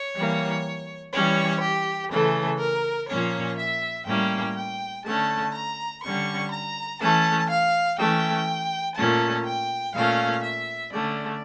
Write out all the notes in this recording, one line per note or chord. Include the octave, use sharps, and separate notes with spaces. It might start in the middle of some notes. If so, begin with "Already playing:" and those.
Already playing: C#5
E3 G3 A#3
E3 G3 C#4 C#5
G4
C#3 E3 A3 A4
A#4
A#2 F3 A#3 C#4 C#5
E5
A2 G3 A#3 C#4 G5
G5
D3 A3 C#4 A5
A#5
D3 G3 C#4 C#6
A#5
E3 A3 C#4 A5
F5
E3 A3 C#4 G5
A#2 A3 C#4 A5
G5
A#2 A3 C#4 F5
E5
D3 A3 C#4 D5